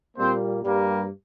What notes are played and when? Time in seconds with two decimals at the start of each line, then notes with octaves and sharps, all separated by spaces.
0.17 A#2 G3 A#3 C4 C5
0.62 G2 G3 A#3